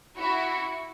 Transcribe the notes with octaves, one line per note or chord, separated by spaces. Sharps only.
E4 F#4